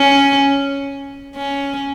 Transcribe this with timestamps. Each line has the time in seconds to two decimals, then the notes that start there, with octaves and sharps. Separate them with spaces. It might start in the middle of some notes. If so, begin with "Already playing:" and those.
Already playing: C#4
1.36 C#4